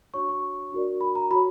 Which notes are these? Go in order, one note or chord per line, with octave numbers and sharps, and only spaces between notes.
D4 F#4 C#5 C#6
C#6
D4 F#4 A#4 D5
B5
A#5
F#4 C#5 B5